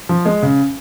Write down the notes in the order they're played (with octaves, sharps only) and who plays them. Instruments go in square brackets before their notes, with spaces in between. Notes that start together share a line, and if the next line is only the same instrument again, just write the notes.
[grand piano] F3
G#3
C#3